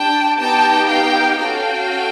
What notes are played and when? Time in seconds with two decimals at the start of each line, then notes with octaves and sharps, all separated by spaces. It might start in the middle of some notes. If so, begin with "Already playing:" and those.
Already playing: D4 G4 G5 A5
0.38 B3 D#4 G4 G5 A5
0.88 F5 G5
1.38 C#4 F#4 A4 F5 G5